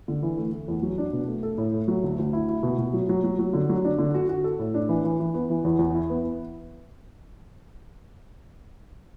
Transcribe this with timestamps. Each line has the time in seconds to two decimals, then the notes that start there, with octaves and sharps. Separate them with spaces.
0.08 D3
0.23 E3
0.37 A3
0.52 A3
0.68 E2
0.83 F#3
0.98 D4
1.13 B2
1.28 A3
1.43 A4
1.58 A2
1.74 A3
1.88 F#3
2.04 D2
2.19 D2
2.33 E4
2.49 E4
2.63 B2
2.78 B2
2.93 F#3
3.09 F#3
3.24 F#3
3.39 F#3
3.54 D3
3.69 F#3
3.84 D4
3.99 D3
4.14 F#4
4.29 F#4
4.44 A4
4.59 A2
4.74 D4
4.89 E3
5.05 E3
5.20 E3
5.34 B3
5.50 E3
5.65 E2
5.79 E2
5.95 E4
6.10 B3